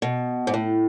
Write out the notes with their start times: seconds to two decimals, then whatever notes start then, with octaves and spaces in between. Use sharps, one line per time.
0.02 B2
0.47 G#2
0.54 A2